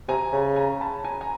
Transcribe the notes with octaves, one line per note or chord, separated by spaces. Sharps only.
C3 G#5 A#5
C#3
G#5 A#5
A5 B5
G#5 A#5
G#5 A#5